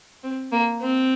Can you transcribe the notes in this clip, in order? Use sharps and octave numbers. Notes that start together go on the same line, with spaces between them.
C4
A#3
C4